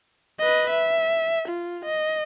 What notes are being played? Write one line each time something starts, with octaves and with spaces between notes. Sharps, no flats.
B4 D#5
E5
F4
D#5